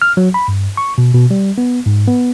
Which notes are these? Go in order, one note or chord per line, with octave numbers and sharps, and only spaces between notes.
F6
F#3
B5
G2
C#6
B2
B2
G3
B3
G#2
B3